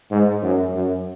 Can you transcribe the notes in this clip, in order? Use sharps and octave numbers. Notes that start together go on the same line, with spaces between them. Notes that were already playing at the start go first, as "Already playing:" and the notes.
G#2
F#2
F#2